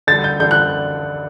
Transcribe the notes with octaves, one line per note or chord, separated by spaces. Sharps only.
D3 G3 A6
G6
D3 G3 G6
F#6